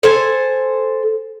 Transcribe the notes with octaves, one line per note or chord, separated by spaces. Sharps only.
A4 C5 G#5